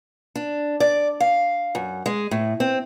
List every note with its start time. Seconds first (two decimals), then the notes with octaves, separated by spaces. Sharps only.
0.35 D4
0.80 D5
1.20 F5
1.75 F#2
2.06 G#3
2.31 A2
2.60 C4